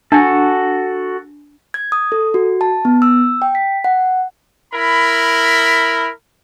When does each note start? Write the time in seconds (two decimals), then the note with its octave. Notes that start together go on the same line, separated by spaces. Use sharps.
0.12 D4 F#4 A4 G#5 A5
1.74 G#6
1.92 D#6
2.12 A4
2.34 F#4
2.61 A5
2.85 B3
3.02 E6
3.42 G5
3.55 B6
3.84 F#5
4.74 E4 A#4 B5